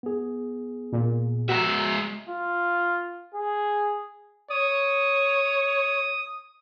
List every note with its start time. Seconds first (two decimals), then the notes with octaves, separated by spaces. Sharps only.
0.03 B3 G#4
0.93 A#2
1.49 G#3 F#4 E5 A#5
2.29 F4
3.34 G#4
4.50 C#5 D#6